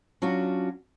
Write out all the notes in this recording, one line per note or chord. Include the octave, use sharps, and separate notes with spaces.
F#3 C#4 D4 F4 F#4